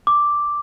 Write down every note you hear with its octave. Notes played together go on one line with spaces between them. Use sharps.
D6